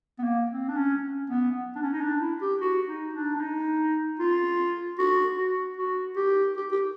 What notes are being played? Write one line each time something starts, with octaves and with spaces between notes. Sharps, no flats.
B3
A#3
C4
D4
C#4
B3
D4
C#4
D#4
D4
E4
G4
F#4
D#4
D4
D4
D#4
F4
F#4
F#4
F#4
G4
G4
G4